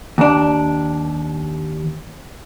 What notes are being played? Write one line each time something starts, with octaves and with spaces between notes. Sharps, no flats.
D#2 D4